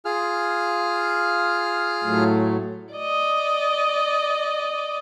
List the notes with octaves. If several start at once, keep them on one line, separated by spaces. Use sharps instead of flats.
F4 G#4 F6
A2 F#3 A3
D5 D#5